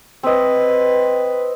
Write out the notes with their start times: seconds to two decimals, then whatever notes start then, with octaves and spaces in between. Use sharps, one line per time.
0.23 C4 B4 D#5